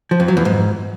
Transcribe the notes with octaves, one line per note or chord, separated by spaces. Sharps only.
F3
F2
F#3
E2
G#2